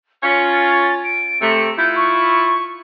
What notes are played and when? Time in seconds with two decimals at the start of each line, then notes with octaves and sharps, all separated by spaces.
0.23 C#4 F4 C#7
0.52 A6
1.04 D7
1.41 C3 A3 C#7
1.77 E4 F4 G6
1.95 C#6